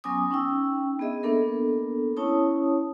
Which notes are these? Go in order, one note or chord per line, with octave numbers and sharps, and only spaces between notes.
F#3 B3 C#4 G#5 D6 D#6
C#4 D#4 G5 E6
B3 D4 G#4 D#5 E5
A#3 B3 D4 A4 A#4
C#4 E4 C#5 A5 D#6